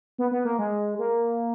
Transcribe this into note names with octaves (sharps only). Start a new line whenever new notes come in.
B3
B3
A#3
G#3
A#3